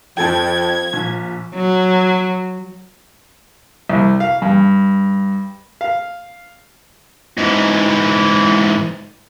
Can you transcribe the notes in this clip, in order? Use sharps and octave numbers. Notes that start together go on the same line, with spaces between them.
F2 F3 A4 G5 G#6
A#1
F#3
C2
F5
G2
F5
G#2 E3